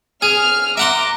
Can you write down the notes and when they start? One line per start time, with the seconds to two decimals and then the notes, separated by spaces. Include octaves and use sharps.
0.22 G#4 F6
0.77 E5 F#5 A#5 C6 D6